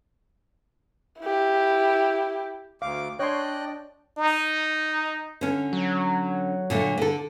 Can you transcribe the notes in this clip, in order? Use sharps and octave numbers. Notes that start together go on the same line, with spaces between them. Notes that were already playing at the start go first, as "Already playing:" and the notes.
E4 G4
D2 F5 D6
D4 C#5 D#5 G5 C6 F#6
D#4
D3 C#4
F#3
A#2 D3 A3
D3 A4